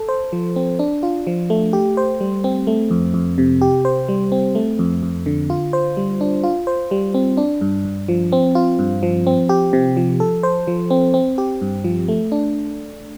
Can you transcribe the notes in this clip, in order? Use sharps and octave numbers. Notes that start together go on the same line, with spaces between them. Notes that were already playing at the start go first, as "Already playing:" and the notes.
Already playing: A4
C5
F3
C4
D4
F4
F3
A3
G4
C5
G3
C4
A3
F2
F2
C3
G4
C5
G3
C4
A3
F2
F2
D3
F4
C5
G3
D4
F4
C5
G3
C4
D4
G2
G2
F3
C4
F4
G2
F3
C4
G4
C3
F3
A4
C5
F3
C4
C4
G4
G2
F3
A3
D4